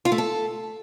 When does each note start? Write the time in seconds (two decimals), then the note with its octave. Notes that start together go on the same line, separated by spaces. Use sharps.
0.05 F4
0.12 A3
0.18 A4